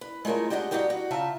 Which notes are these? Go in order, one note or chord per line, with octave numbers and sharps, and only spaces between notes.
B4
G#3 A3 F4 A#4 C#5
G4 G#4 D5 D#5 F5 F#5
G2 D#3 D#4 F#4 G4 G5
F#4
C#3 F4 E5 A5 A#5